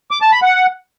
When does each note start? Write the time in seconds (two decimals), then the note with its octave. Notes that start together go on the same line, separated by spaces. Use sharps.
0.11 D6
0.22 A5
0.32 B5
0.43 F#5